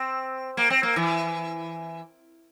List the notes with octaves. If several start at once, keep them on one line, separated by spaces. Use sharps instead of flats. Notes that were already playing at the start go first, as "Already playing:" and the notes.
Already playing: C4
A#3
C4
A#3
E3